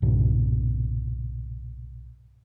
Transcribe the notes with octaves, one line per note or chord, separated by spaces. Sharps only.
B1 G2 A#2 C#3